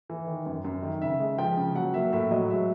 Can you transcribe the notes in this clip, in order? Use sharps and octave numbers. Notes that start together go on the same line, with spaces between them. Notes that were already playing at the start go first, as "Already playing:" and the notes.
E3
D#3
F#2
F#2
D#3
C#3 E5
G#3
F3 G5
C#3
F#3 F#5
A#3 E5
A2 E5
F#3 D#5
G#3 E5